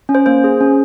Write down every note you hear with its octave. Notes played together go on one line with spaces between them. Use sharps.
C#4
C5
A#3 C5
G#4
C#4